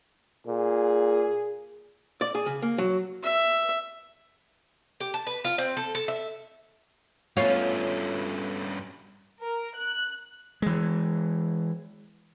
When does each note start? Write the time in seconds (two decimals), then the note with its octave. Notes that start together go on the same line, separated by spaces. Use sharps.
0.47 A#2 G#4
2.21 D5
2.35 G#4
2.46 C#3
2.62 A#3
2.78 F#3
3.23 E5
5.00 G4
5.14 A5
5.27 B4
5.44 F4
5.58 C4
5.77 A4
5.95 A4
6.08 E5
7.37 G2 A3 B3 C#4 F4 C#5 F5
9.42 A#4
9.76 F#6
10.62 E3 G#3